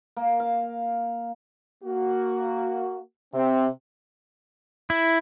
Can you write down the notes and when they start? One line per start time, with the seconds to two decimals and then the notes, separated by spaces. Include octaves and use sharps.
0.17 A#3
0.40 F5
1.84 A#3 F#4
3.34 C3 C4
4.90 E4